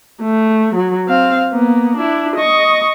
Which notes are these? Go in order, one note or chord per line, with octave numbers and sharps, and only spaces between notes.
A3
F#3
C4 F5
A#3 B3
D4 E4
D#5 C#6